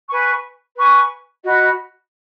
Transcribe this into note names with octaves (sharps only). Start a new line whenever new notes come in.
B4 G#5 C#6
B4 G#5 C#6
F#4 D#5 B5